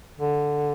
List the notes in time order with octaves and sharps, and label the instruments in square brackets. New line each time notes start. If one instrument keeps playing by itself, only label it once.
[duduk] D3